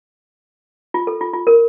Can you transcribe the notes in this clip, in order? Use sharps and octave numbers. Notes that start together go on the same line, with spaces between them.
F4
A4
F4
F4
A#4